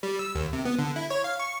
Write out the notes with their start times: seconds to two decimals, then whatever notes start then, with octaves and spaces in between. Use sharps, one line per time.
0.03 G3
0.19 E6
0.35 D#2
0.53 C3
0.65 B3
0.79 D3
0.96 E4
1.10 C#5
1.24 F5
1.40 C#6